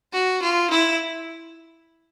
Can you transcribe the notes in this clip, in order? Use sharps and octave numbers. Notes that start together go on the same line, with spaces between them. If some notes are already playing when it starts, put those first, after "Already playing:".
F#4
F4
E4